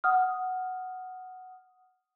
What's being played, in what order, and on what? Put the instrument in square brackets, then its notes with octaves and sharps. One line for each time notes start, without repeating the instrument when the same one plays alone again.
[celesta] F#5 D#6 F6